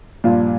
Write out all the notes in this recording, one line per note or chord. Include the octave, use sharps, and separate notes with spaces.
G2 A#2 F3 D4 F4